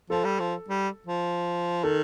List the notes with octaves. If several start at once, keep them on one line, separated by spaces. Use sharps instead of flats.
F3 A4
G3
F3
G3
F3
D#3 A4